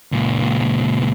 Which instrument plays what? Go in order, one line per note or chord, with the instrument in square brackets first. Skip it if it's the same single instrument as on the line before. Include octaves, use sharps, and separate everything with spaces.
[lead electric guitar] C#2 A#2